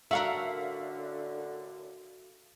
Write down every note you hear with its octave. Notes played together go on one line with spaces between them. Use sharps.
F#2 A2 D3 F#4 A4 A#4 E5 F5